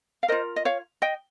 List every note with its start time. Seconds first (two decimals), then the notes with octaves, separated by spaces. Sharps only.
0.23 F5
0.28 F4 A#4 C5 D#5
0.56 D#5
0.65 C#5 F5
1.02 D#5 G5